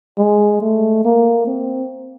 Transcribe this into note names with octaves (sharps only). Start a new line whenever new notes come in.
G#3
A3
A#3
C4